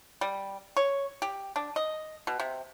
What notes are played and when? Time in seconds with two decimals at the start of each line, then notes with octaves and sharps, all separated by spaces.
0.21 G3
0.77 C#5
1.22 G4
1.56 D4
1.76 D#5
2.27 B2
2.40 C3